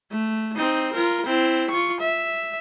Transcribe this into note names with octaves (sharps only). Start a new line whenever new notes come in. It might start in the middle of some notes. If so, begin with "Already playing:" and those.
A3
C4 D#4
F4 A#4
C4 E4
F4 C#6
E5